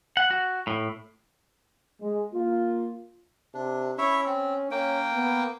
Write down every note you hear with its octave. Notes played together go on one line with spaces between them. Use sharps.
F#5
F#4
A2
G#3
A#3 F4
C3 D4
C#4 E4 C#5 E5
C4
A#3 C#4 G5
B3